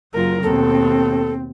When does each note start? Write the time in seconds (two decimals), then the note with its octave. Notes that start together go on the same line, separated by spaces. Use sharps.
0.14 F#1 F4 A#4
0.43 D#2 B2 C4 A4